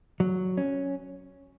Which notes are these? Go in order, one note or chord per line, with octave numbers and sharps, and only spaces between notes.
F#3
C#4